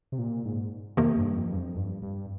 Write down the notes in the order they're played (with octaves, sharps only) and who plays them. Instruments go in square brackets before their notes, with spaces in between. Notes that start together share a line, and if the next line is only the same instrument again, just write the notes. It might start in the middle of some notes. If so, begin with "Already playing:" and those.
[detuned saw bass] C3
A#2
G#2
[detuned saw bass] F2 [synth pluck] C3 D#3 A#3
[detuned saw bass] G2
F2
G2
F2
G2
G2